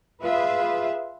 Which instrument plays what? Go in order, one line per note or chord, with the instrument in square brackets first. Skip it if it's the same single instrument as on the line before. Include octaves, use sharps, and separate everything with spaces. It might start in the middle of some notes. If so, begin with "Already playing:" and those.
[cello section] F4 G#4 B4 E5